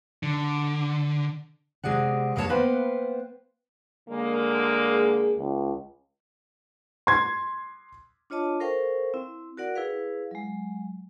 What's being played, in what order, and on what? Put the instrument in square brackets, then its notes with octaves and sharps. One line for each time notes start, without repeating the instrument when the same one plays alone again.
[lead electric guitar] D3
[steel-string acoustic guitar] C3 G#3 G#4 D5 F#5
G2 G#3 A#3 B3 C#5 A5
A#3 B3 B4 C5 F5 G5
[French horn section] D3 G#3 A#3
[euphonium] G#4
C#2
[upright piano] C6 G#6
[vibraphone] D4 F4 C#5 D#5 A5
A4 A#4 C5 F5 G5 C#6
C4 E4
F#4 A#4 D5 F#5
E4 G#4 B4 F5
F#3 G#3